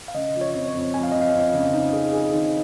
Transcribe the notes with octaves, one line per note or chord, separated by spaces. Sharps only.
F5
C#3 D#5
F3
C#5
F2
C#5
F2
F2 G#5
F5
F2 D#5
F5
F2
C#3
D#4
G#4
G#4
D#3